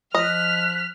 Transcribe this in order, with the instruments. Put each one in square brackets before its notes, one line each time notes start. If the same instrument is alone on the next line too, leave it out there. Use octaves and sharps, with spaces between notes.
[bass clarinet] F3 [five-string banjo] D#5 [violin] F6 [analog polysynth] F#6 B6